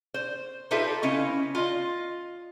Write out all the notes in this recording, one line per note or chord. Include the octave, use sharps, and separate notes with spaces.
C5
D#4 F4 G4 A4 B4 E5
C#3 C#4 E4 D#5
F4 D#5